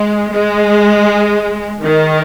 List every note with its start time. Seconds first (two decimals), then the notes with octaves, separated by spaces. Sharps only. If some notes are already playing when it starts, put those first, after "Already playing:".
Already playing: G#3
0.32 G#3
1.83 D#3